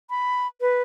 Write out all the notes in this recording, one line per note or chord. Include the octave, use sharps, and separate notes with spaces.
B5
B4